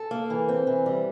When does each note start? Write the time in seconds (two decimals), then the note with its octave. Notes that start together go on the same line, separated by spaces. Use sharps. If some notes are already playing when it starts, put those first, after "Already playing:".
Already playing: A4
0.11 A#3
0.30 E3
0.49 C4
0.67 E3
0.86 G3